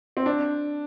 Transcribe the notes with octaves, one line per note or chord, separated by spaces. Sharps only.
C4
D4